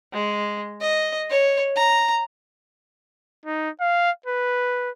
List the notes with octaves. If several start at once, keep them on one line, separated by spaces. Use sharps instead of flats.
G#3
D#5
C#5
A#5
D#4
F5
B4